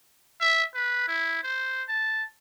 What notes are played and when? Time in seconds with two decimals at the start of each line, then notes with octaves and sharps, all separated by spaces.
0.41 E5
0.74 B4
1.08 E4
1.43 C5
1.88 A5